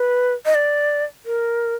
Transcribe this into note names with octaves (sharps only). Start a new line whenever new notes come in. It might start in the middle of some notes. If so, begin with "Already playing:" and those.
Already playing: B4
D#5
D5
A#4